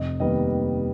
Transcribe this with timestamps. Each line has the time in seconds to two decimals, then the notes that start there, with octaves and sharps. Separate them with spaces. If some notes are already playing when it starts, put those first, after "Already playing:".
Already playing: F1 D#5
0.20 D#2 D#3 G3 B3 D#5